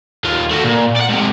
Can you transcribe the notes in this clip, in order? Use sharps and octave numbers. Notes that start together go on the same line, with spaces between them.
D#2 F4
A3 F#4
A#2
D5 F#5
G#2 C3